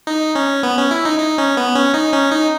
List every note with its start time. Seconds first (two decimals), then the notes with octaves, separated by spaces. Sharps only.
0.07 D#4
0.35 C#4
0.63 B3
0.78 C#4
0.91 E4
1.05 D#4
1.19 D#4
1.38 C#4
1.57 B3
1.75 C#4
1.94 D#4
2.12 C#4
2.32 D#4